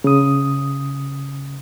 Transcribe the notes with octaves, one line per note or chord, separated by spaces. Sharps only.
C#3 D#6